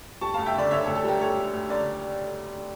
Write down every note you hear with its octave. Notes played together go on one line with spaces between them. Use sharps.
G3 A5 C#6
D2 F5 A5
E5 G5
D3 A#4 D5
D3 C#5 E5
D2 A4 C#5
A4
G3 G4 A#4
D2 A4 C#5
G3
D2
D3 A#4 D5